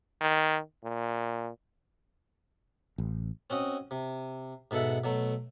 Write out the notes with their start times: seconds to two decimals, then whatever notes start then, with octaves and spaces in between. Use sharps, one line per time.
0.21 D#3
0.83 A#2
2.98 A1
3.50 C4 C#4 F#4 D#5
3.91 C3
4.71 G#2 B2 A4 E5 F#5
5.04 B2 F#3 A3